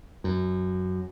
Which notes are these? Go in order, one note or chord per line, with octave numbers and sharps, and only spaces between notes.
F#2